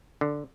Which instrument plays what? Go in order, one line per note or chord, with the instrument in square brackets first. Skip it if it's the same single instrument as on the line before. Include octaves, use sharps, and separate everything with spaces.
[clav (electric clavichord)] D3